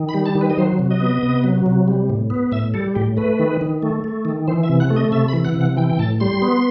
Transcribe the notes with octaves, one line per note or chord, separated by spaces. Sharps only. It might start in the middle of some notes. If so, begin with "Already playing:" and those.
Already playing: D#3
B5
G3
A5
D#3
B4
D#5
F#3 C5
C3
D#5
B3
C3
F#3
C3
G3
A2
B3
A2 E5
G3 A4
A2 G4
A3 B4
D#3
D#3
A3
A3
D#3
E3 C5
E5
C3
F#5
A3
D#5
C3 E5
B5
E3
F#5
C3 F#5
E3 G5
G5
A2 A5
G3 C6
B3